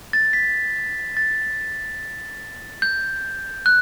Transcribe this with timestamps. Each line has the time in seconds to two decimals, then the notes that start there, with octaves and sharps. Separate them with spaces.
0.13 A6
0.33 B6
1.17 A6
2.82 G6
3.66 F#6